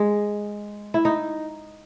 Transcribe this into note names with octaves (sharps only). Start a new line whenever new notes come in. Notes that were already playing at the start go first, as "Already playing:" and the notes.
Already playing: G#3
E4
D#4